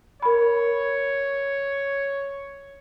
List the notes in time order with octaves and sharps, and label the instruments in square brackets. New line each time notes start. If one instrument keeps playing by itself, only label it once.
[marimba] A#4 B5 [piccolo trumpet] C#5